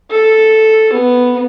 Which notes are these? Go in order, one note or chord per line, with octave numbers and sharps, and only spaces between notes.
A4
B3